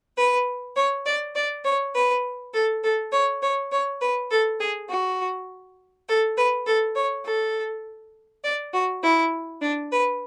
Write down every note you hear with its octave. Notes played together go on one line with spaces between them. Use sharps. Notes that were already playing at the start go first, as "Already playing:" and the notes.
B4
C#5
D5
D5
C#5
B4
A4
A4
C#5
C#5
C#5
B4
A4
G#4
F#4
A4
B4
A4
C#5
A4
D5
F#4
E4
D4
B4